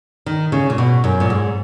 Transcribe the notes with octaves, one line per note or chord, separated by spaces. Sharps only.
D#3
C#3
A#2
B2
F#2
A#2
G#2